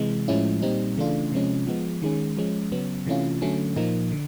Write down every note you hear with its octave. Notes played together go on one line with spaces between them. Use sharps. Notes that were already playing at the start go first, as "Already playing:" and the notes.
Already playing: C3 E3 G#3
A2 F3 G#3 C#4 E4
A#2 G3 C4 D#4
C#3 E3 A3 D4 F4
C3 F3 G#3 C#4
F3 G#3 B3
D#3 G#3 C#4
F3 G#3 C#4
C#3 F#3 B3
C3 E3 A3 C#4 F4
D3 F#3 A3 C#4
A#2 F3 A#3 D#4
D3